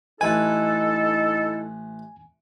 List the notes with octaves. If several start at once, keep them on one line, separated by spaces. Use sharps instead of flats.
A1 D#4 E4 A4 B4 G#5